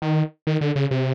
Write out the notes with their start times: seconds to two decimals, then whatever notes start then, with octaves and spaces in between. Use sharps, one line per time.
0.02 D#3
0.47 D#3
0.61 D3
0.76 C#3
0.91 C3